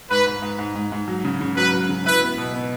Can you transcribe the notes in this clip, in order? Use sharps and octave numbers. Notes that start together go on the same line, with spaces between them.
G#2 B4
G#2
G#2
G#2
G#2
G#2
F#3
C#3
C#3
F#3 B4
F#3
C#3
E4 B4
B3
B2
B3